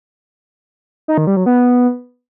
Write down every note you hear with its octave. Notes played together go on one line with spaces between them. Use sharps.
D#4
D#3
G3
F#3
B3